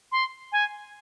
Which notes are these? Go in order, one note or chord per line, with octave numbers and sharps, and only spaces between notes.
C6
G#5